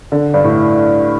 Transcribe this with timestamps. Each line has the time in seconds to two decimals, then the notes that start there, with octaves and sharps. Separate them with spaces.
0.12 D3
0.34 G2
0.44 A2